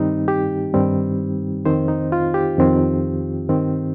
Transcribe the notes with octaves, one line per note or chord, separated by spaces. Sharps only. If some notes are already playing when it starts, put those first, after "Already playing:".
Already playing: G2 D#3 G3 C4 D#4
G4
G2 D#3 G3 C4
F2 D#3 C4 C5
D#4
F4
G4
F2 D#3 C4
G2 D#3 C4